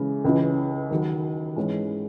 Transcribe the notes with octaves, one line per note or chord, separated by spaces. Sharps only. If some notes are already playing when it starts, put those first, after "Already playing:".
Already playing: C#3 E3 G#3
C#2 C#3 E3
D#2 D#3 F#3
G#2 E3 G#3 C#4